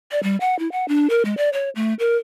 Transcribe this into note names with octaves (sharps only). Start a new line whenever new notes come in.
D5
G3
F#5
E4
F#5
D4
A#4
G#3
D5
C#5
A3
A#4